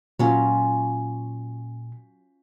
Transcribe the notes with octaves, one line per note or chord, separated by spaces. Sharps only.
A#2 F#3 C#4 F4